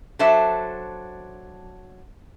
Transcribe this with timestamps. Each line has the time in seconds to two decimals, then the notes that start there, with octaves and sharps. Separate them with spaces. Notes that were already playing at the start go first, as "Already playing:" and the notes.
0.19 F#3 D4 A4 C5 E5